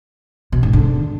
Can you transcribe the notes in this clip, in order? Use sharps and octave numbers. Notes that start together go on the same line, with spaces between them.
B2
G#2
D3